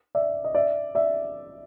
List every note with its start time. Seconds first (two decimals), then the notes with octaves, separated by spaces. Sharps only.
0.15 D5 E5
0.44 D#5
0.55 D5 E5
0.95 D5 E5